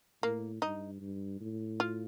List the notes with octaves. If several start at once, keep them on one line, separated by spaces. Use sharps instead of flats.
A2 A#3
G2 D#4
G2
A2
F4